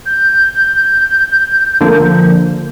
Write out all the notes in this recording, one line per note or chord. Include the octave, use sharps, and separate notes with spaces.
G6
D3 F3 A#3